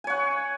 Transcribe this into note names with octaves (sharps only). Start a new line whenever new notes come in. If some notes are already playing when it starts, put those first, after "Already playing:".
C#5 F#5 G#5